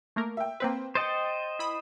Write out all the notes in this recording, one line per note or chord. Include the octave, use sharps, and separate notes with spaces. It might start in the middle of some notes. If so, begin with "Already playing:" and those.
A3 A#3 A#4
E5 G5
A#3 C4 B4 C5 G5
C5 D#5 G5 A6 C#7
E4 B5 D#6